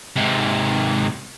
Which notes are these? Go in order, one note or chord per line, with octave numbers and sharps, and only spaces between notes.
G#2 C3